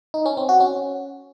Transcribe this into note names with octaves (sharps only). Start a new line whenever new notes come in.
D#4
C#4
C4
F#4
C#4